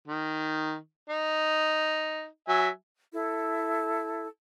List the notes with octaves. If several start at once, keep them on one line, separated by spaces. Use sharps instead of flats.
D#3
D#4
F#3 E5 G#5
E4 A4